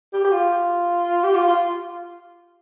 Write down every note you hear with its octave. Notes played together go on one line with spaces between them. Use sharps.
G4
G4
F4
G4
F4
F4